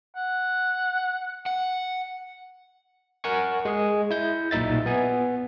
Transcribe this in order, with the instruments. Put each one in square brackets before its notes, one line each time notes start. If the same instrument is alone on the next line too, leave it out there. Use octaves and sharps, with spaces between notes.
[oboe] F#5
[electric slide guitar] F#5
[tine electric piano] A#4 F#5 G#5 C#6
G#3 G#4
E4 G6
B1 A#2 D#4 E5 A6
B3 G#5